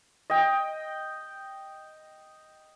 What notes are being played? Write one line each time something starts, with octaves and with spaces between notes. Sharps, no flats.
D#5 G5